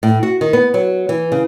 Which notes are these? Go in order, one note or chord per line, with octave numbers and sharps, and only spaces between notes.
A2
F#4
D#3
B3
F#3
E3
C#3